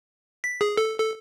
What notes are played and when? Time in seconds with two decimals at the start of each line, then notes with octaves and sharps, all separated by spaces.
0.44 B6
0.61 G#4
0.77 A4
0.98 A4